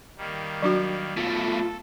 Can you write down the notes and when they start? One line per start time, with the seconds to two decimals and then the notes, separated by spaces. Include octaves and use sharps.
0.17 D#3 G3 A#3
0.62 F#3 D4 F#4
1.17 B2 A3 F4 A4